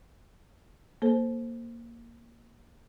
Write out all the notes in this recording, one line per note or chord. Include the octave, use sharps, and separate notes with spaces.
A#3 A4 C5